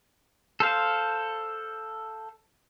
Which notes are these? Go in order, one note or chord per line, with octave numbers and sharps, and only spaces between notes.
A4 C5 F5